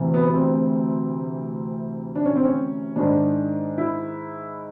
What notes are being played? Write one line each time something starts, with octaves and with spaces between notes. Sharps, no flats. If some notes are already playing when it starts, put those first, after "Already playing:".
Already playing: D2 C3 E3
B3
B3
C4
D4
C#4
C4
C#4
G#2 D#3 G#3 D4
E4